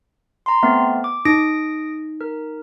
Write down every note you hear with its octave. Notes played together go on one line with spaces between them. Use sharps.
A#5 C6
A3 B3 C4
D6
D#4 D#6 A#6 D7
A#4